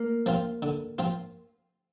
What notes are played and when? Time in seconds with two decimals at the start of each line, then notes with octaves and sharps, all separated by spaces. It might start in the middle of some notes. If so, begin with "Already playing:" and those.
Already playing: A#3
0.26 F3 C4 F4
0.62 D3
0.98 F3 C4 F4